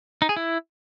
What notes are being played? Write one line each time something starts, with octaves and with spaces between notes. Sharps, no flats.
D#4
G#4
E4